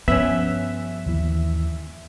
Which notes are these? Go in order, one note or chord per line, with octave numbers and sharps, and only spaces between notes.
G2 F3 B3 C#4 E5
D#2 E3